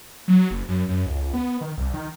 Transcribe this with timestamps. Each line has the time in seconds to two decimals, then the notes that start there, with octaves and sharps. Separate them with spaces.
0.28 F#3
0.51 F#1
0.68 F#2
0.88 F#2
1.06 C#2
1.34 B3
1.61 D#3
1.78 C2
1.94 D#3